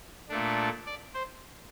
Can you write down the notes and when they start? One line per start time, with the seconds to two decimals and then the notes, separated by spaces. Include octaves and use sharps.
0.29 A#2 A3 D4
0.86 D5
1.14 C5